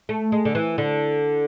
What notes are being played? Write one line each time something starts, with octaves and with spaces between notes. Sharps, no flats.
A3
G#3
D3
E3
D3